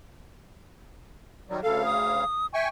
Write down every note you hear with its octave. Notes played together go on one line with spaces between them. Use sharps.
D#3 F#3 G3
D2 C#3 A4 F5
D#6
E5 G5 G#5 C#6